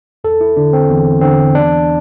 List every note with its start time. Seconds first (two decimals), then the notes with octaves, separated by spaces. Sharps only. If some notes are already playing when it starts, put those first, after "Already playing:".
0.24 E2 A4
0.41 E4
0.57 D3 D4
0.73 C4
0.90 E2
1.21 D3 C4
1.55 E2 D4